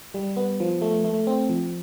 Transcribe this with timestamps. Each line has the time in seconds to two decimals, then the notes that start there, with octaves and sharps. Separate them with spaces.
0.14 G3
0.37 B3
0.60 F3
0.82 A3
1.04 A3
1.27 C4
1.49 F3